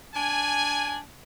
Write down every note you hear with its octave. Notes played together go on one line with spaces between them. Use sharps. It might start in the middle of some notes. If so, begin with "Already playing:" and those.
D4 G#5